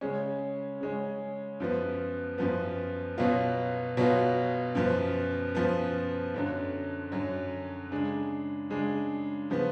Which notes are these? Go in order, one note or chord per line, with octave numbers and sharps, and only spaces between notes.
C#3 G#3 C#4
C#3 G#3 C#4
F#2 F3 B3
F#2 F3 B3
B2 F#3 B3 F4
B2 F#3 B3 F4
F#2 F3 B3
F#2 F3 B3
F#2 D3 F#3
F#2 D3 F#3
C#3 G#3 D4
C#3 G#3 D4
C#3 F3 B3